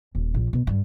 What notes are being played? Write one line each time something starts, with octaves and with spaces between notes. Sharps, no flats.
D#1
A#1
B2
G2